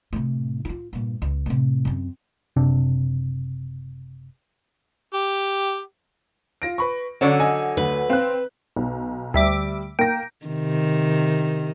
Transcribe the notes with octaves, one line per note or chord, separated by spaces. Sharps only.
A2 C3
E4 F4
G2 A#2
C#2
A2 C3
F#2 C4
F#1 C3 D4
G4
F4 A#6 D7
B4 B5 C#6
D3 F#3 C#4 C#5 D5
D#5 G#5
D2 B4
C4 F5 F#6
B1
D2 G3 E5 D6
A#3 G5 A#6
C3 D#3